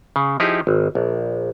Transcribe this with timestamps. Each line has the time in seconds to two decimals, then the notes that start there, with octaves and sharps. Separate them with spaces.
0.16 C#3
0.40 F3 D#4 E4 G4 G#4
0.67 G#1
0.95 A#1